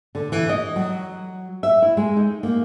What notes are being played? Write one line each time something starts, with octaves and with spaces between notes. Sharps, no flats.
D3
E3
D#5
F#3
E5
E4
G#3
D#4
A#3